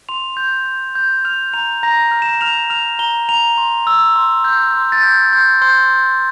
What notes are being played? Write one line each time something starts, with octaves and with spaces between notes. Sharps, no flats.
C6 F7
G6
G6
G6
F6 F7
A#5 F7
A#5 A#6
F6
E7
F6 F7
F6 F7
A#5 G7
A#5 F7
C6
E6
C6
G6
C6
A6
G6
C6 G6
C6 G6
G6